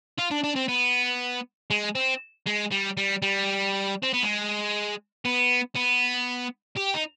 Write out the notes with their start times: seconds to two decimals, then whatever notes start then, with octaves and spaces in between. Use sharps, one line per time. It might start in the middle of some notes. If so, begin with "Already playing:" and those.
0.18 F4
0.31 D4
0.44 D4
0.56 C4
0.69 B3
1.70 G#3
1.95 C4
2.47 G#3
2.72 G3
2.97 G3
3.22 G3
4.03 C4
4.14 B3
4.23 G#3
5.25 B3
5.75 B3
6.77 G4
6.94 D#4